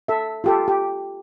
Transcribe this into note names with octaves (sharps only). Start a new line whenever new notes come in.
A4 E5
F4 G4 A4
G4